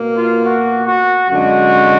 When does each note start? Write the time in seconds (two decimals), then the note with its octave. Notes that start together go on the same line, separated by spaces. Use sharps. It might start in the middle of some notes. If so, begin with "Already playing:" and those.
Already playing: B2 A#3
0.14 F4
0.44 F#4
0.86 F#4
1.30 F#2 D3 G#3 F#4